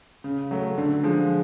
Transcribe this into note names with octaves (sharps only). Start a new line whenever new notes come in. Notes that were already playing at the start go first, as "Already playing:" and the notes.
C#3
F#3 A3
D3
F3 G#3